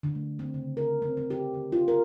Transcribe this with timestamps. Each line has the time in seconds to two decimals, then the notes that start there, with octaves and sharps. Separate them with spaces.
0.03 D3
0.15 A3
0.39 C4
0.54 C#3
0.77 A#4
1.02 C4
1.17 C4
1.30 G4
1.54 D3
1.72 F4
1.88 A#4